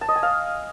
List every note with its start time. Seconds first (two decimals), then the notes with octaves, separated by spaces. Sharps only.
0.01 A5
0.08 D#5
0.16 G#5
0.23 F5